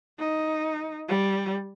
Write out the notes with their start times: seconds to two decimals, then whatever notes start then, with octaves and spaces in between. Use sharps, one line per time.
0.19 D#4
1.09 G3